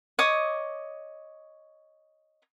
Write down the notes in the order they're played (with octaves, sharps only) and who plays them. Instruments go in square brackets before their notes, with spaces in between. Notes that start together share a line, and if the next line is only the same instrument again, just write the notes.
[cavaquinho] C#5 D#5 D6 D#6